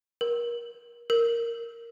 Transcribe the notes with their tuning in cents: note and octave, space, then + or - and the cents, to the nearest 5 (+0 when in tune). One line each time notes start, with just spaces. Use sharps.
A#4 +30
A#4 -5